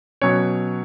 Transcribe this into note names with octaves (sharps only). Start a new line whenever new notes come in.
B2 F#3 C#4 C#5